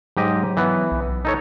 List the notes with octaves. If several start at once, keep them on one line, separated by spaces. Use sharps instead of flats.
G#2 F#3 G4 D#5
E3 B3
B1
D#4 A4 C#5